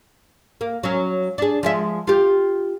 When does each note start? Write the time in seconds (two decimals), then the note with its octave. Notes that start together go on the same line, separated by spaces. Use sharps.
0.61 A#3
0.83 F#3 C#4
1.38 D4 G#4
1.63 F3 G#3 E5
2.07 F4 G4